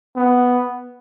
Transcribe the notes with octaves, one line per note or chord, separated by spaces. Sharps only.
B3